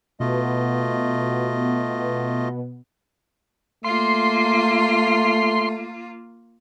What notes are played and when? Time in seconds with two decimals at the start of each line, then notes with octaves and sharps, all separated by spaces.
0.20 B2 A3 B3 F4 D#5
3.84 A3 A#3 F4 C6